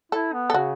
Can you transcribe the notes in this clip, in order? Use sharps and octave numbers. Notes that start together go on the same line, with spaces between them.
E4 A4
B3
A4
C#3 F#4